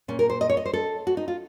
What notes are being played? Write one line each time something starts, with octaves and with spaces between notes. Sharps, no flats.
A#2 C#4
A#4
C5
D#5
C#5
D#5
C5
A4
F#4
D#4
F4